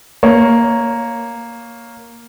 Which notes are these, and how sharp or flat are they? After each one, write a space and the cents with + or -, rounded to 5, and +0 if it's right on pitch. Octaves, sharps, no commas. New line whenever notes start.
A#3 +0 C#5 +5